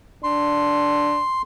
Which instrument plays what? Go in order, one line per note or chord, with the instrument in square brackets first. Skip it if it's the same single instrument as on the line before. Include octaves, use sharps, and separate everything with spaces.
[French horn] D4 [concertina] C6